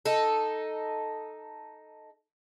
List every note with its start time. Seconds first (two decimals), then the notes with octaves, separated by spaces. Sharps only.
0.05 D#4 A4